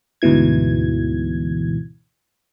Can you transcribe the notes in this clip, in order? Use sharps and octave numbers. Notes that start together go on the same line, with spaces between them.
D2 G#2 B2 E3 G#6